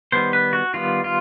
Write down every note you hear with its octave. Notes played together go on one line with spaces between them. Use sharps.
D#3 G3 B3 C5
B4
F#4
D#3 G3 B3 F4
F4